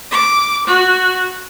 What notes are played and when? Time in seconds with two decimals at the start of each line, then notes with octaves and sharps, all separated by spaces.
0.12 D6
0.67 F#4